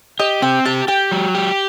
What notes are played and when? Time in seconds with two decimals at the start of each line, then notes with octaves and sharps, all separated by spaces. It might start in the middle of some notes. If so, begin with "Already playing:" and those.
0.19 G4 D#5
0.42 C4 G5
0.65 G4 A5
0.88 G4 G5
1.11 F#3
1.35 G4